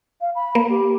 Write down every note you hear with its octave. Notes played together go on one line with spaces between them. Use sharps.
F5
B5
A#3
G4